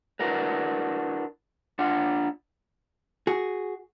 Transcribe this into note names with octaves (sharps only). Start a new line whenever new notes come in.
D4 E4 F#4 A#4 B4
D4 F4 F#5
F#4 G#4